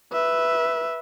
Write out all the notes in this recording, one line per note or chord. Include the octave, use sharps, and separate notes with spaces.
B4 E5